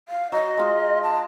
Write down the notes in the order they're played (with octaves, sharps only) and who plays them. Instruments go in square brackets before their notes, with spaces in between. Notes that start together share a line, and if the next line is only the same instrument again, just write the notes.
[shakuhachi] F5
[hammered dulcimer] F#3 [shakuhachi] D#5
[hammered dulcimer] G#3 F4 G#4
[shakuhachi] A5